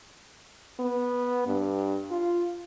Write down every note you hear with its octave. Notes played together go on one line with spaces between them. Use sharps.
B3
G2
F4